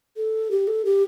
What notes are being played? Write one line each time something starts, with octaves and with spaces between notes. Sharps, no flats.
A4
G4
A4
G4